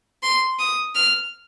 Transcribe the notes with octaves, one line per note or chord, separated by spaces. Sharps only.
C6
D#6
F6